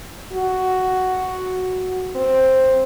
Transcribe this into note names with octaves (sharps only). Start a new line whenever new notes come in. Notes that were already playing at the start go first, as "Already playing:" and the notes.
F#4
C4